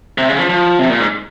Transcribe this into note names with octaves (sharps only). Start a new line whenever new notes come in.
C3
C#3
F3
F3
C3
A#2
G#2